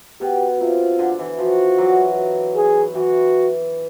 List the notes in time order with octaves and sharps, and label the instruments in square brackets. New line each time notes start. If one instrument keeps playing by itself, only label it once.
[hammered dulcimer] B2 [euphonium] G4
[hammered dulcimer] C3 [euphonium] F4
[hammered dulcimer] D3
E3
[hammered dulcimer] F3 [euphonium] F#4
[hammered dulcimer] E3 F#3
[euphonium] G#4
[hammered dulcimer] E3 [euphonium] F#4